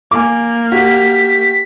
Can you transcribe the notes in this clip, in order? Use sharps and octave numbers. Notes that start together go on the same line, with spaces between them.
A#3 G#5 D6
F#4 G4 B6